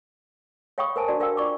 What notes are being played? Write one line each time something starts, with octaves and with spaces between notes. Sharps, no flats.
C#5 F5 G5 B5 C#6 D#6
A#4 C5 G#5 A5
D4 F#4 D5 A5
A#4 F5 G5 E6
F4 D5 C#6 D6